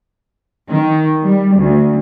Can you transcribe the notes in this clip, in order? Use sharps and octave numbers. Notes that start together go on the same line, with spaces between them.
D#3
G3
D2